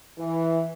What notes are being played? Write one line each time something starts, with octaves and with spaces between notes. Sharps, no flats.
E3